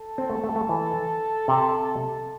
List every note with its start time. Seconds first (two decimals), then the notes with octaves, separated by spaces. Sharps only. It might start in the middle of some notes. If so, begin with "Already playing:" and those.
Already playing: A4
0.18 C4
0.30 A3
0.44 A3
0.56 A3
0.69 E3
1.48 C3 A4
1.87 A4